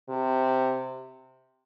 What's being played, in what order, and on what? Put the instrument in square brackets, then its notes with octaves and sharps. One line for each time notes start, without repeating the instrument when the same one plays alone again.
[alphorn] C3